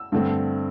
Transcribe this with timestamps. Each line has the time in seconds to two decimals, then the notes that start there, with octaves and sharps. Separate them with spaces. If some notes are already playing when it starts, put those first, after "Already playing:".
Already playing: E6
0.12 G2 D3 A3 C4